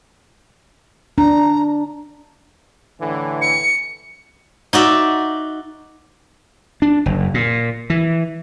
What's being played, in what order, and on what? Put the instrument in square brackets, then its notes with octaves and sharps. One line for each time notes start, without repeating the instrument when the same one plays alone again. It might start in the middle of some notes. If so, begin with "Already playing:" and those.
[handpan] D4 [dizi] A#5
[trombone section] A2 D3 E3
[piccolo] C#7
[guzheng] D#4 F#4 D5 E5
[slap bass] D4
F#1
A#2
E3